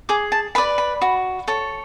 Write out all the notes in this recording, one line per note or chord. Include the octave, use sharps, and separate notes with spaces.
G#4 D6
A5
B4 D5 B5
B5
F#4
A4 C#5